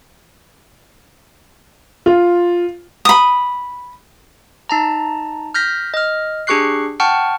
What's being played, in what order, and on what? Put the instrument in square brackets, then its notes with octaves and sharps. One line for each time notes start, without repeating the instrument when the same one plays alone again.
[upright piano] F4
[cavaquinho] B5 D#6
[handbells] D#4 A5 A#5
F6 G6 A#6 B6
D#5 F6
D4 G4 G#4 C#6 F#6 C7
F#5 G5 A5 C#6 F6